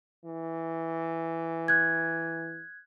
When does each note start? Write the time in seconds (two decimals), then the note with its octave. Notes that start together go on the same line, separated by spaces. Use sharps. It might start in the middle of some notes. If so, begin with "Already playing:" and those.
0.25 E3
1.68 F#6 G#6